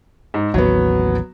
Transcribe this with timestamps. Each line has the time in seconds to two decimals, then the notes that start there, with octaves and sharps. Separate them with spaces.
0.34 G#2
0.54 A1 D#2 F#3 B3